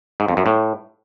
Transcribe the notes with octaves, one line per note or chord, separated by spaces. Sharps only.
G#2
F2
F#2
A2